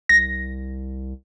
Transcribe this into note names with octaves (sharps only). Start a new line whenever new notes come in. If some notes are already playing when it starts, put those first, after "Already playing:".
C2 A#6